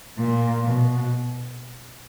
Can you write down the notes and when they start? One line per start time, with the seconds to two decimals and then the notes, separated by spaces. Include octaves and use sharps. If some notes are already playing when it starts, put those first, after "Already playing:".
0.19 A#2
0.65 B2